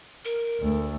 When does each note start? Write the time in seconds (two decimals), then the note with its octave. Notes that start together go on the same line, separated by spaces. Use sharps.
0.25 A#4
0.60 D2 A3